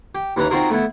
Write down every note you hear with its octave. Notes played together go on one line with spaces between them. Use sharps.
G4
D#2 E3 C#4 B4 A#5
C4 D#4 F4 F#4 G#4 A#4
A3 B3 E4